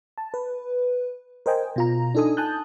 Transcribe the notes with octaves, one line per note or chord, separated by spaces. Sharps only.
A5
B4
A#4 C5 D#5 G5 G#5
B2 F4 A#5
D4 D#4 A4 G#5 D#6
G#5 A5 D#6 F#6 G6